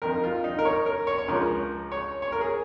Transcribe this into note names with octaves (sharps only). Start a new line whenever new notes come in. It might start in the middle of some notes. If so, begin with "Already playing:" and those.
F2 D#3 A#4
F4
D#4
A#4
C#5
A#4
C#5
C#5
C#2 C#3 F3 A#4
C#5
C#5
A#4
G#4